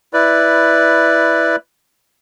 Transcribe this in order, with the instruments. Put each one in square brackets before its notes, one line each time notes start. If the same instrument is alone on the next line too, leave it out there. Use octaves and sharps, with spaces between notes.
[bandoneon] E4 B4 D5